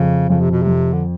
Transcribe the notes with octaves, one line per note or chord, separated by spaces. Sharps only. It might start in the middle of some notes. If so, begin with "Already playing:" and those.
Already playing: F2 C#3
F2 C#3
C3
B2
F2 C3
D3